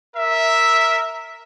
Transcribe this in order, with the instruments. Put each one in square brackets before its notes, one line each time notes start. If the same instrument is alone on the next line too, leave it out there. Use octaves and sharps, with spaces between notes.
[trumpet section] A#4 E5